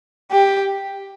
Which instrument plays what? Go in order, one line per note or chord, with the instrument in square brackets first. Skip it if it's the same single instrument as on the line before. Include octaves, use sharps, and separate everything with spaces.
[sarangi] G4